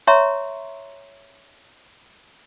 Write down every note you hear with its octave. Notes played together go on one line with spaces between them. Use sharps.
C#5 E5 A#5 C6 C#6